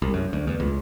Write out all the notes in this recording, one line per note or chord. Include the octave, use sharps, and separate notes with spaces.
C2
F#2
D2
E2
C#2